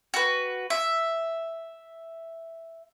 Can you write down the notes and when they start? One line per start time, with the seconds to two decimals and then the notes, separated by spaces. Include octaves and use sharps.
0.14 F#4 B4
0.70 E5